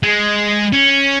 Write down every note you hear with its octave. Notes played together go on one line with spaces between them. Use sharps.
G#3
C#4